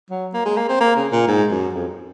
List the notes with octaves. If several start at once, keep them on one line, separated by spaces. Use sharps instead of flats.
F#3
A#3
G#3
A#3
C4
A#3
C#3
A#2
G#2
F#2
F2